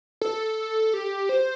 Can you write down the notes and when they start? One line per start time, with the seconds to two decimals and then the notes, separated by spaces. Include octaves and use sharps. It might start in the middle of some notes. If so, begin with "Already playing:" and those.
0.22 A4
0.94 G4
1.29 C5